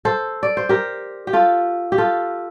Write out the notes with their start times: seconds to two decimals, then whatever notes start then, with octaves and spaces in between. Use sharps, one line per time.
0.05 A4 C5
0.43 D5
0.57 C5
0.69 G4 A#4
1.27 G4
1.33 F4 A4
1.92 G4
1.98 F4 A4